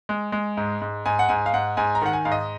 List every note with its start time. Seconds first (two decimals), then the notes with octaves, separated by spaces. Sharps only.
0.09 G#3
0.32 G#3
0.57 G#2
0.82 G#2
1.06 G#2 G#5
1.19 F#5
1.29 G#2 G#5
1.46 F5
1.54 G#2 F#5
1.77 G#2 G#5
1.95 A#5
2.02 D#3 F#5
2.13 G#5
2.25 G#2 F5
2.32 D#5